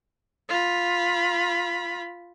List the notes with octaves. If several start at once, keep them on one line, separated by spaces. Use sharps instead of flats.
F4 B5